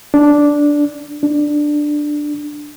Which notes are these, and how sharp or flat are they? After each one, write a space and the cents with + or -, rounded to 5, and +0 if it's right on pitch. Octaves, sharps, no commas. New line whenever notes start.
D4 -5
D4 +10